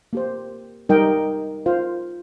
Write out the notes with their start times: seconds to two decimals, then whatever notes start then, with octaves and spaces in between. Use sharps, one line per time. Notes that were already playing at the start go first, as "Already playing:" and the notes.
0.13 A#3 G4 C5
0.89 G3 D#4 A#4 D#5 G5
1.66 F4 C5 F5